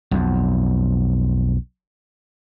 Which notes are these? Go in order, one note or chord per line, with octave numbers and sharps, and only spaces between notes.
B1 F2